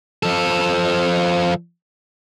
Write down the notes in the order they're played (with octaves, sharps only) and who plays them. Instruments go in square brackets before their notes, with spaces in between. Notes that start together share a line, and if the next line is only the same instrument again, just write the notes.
[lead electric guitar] F3 A4